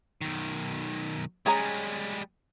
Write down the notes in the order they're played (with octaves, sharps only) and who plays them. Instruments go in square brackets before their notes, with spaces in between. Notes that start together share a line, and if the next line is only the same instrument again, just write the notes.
[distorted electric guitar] B1 D#3
[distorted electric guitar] G3 G#3 [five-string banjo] C#4 G#4 A#5